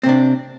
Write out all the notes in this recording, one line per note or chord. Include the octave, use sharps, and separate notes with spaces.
C3 C4 D4